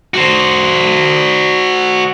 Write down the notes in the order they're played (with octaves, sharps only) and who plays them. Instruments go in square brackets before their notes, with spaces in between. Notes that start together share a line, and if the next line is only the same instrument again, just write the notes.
[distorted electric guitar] F#4 C5